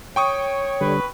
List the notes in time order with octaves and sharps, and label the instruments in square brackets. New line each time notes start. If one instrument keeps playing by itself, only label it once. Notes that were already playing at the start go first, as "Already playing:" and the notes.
[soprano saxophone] C#5 [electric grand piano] G5 C#6 D#6
[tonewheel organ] D3 G3 [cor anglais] B4